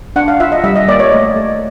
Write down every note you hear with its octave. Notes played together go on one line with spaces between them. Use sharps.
D4 F#5
F5
F4 E5
D#5
G3 E5
D#5
A#3 D5
C#5
A3 D#5
A3